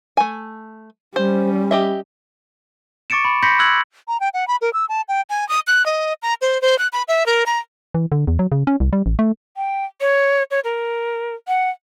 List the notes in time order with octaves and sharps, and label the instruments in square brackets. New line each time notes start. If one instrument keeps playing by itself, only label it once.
[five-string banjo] A3 G#5
[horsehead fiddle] G3 C#4 [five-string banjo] C5
[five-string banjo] G4 D#5 E5
[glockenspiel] C#6 D6 A6 C#7 D7 E7
B5
B5 C6 G6 A#6 B6 C#7
E6 F#6 G#6 F#7
[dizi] A#5
G5
F#5
B5
A#4
E6
A5
G5
G#5
D#6
F#6
D#5
A#5
C5
C5
F#6
B5
E5
A#4
A#5
[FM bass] E3
D3
E2
F#3
C#3
C#4
C2
G3
A1
A3
[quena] G5
C#5
C#5
A#4
F#5